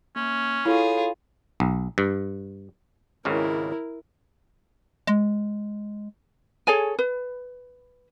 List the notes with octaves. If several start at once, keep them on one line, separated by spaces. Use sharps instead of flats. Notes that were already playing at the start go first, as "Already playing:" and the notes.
A#3 C#4
E4 F4 G#4 A4 C#5 B5
B1
G2
G#1 C#2 C#3 E4 A#4
G#3
G#4 A4 C#5 G#5
B4